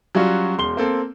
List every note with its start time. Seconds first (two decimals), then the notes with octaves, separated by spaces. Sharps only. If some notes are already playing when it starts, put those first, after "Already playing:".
0.15 F#3 G3 C#4 F4 F#4
0.58 E1 C6 G7
0.77 A#3 C4 A4